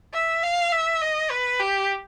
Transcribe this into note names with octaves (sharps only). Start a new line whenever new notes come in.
E5
F5
E5
D#5
B4
G4